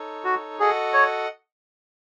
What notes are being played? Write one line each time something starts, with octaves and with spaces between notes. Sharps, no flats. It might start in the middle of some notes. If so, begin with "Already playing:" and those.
Already playing: D#4 A4 C#5
F#4
F#4 G#4 A4 D#5 F#5
C#5